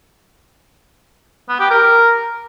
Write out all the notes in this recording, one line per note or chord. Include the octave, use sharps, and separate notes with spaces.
B3
G4
A#4